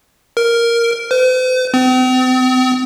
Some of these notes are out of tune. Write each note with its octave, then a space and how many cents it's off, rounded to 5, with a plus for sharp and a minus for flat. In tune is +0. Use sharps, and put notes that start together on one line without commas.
A#4 +0
C5 -45
C4 -40